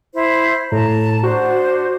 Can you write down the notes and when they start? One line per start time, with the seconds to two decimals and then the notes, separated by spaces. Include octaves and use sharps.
0.14 E4 C5
0.72 A2 A5 A#5
1.23 D4 F#4 C5